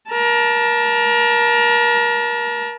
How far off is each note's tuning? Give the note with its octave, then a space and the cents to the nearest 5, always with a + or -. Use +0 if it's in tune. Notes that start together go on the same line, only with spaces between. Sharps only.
A#4 +30 A5 +0